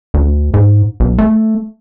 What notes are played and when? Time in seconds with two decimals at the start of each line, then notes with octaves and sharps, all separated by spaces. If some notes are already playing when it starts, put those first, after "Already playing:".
0.14 D2
0.54 G#2
1.00 B1
1.18 A3